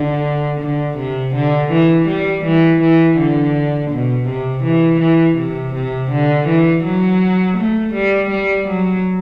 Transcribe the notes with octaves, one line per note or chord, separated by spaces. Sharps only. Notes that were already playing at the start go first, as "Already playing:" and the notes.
Already playing: D3
D3
C3
D3
E3
G3
E3
E3
D3
B2
C3
E3
E3
C3
C3
D3
E3
F#3
A3
G3
G3
F#3